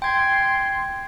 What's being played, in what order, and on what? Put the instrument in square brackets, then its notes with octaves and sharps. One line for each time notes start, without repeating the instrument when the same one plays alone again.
[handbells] G5 G#6 [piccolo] C6